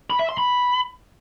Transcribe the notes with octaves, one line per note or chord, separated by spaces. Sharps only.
B5
E5
C6
B5